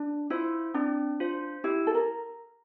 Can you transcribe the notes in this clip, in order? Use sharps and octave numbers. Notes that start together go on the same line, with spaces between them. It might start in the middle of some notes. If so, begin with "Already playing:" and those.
Already playing: D4
E4 F4 C5
C4 D4
F4 C5
E4 G4
A4
A#4